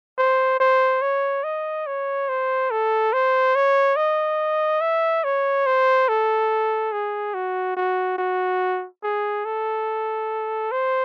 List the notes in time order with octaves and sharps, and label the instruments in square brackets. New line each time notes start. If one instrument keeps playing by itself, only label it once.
[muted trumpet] C5
C5
C#5
D#5
C#5
C5
A4
C5
C#5
D#5
E5
C#5
C5
A4
G#4
F#4
F#4
F#4
G#4
A4
C5